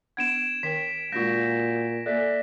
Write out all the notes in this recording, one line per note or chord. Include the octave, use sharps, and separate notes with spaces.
B3 D4 F#5 G#6 D7 E7
D#3 A#4 G5 B6
A#2 G#3 D4 F4 F#4 G6 A#6
A#3 A4 D5 E5 F#6 B6